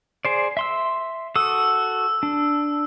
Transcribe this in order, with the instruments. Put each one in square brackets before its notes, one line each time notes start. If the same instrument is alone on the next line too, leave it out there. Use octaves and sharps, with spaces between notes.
[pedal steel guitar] G#4 C5 D5
E5 C6 E6
[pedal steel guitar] F#4 A4 D#6 [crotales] E6
[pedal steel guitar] D4